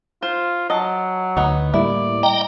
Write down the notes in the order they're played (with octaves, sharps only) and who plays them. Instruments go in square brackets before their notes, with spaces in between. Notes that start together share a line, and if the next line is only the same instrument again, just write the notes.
[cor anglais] F4 [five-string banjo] C5
[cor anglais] F#3 [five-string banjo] D#5 A5
[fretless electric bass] D2 [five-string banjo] B3 D#4 C#5
[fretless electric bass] A2 G3 A#3 [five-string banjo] E4 [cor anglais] D5
[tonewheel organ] D#5 G5 A#5